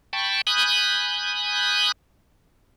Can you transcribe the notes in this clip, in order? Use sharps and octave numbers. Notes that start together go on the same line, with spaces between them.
G5 A5 B5 C#6
G#5 B5 D#6 F#6 G6